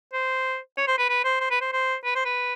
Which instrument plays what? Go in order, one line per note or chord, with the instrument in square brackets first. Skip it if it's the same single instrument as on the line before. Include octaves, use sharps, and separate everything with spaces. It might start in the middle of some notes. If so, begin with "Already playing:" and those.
[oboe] C5
C#5
C5
B4
B4
C5
C5
B4
C5
C5
B4
C5
B4